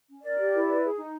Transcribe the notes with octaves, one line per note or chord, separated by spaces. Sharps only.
C#4
A#4 D5
G4
E4
B4
G#4
D#4